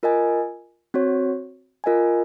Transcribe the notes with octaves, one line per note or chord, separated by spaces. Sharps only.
F4 A#4 D#5 G#5
C4 F#4 C#5
F4 A#4 D#5 G#5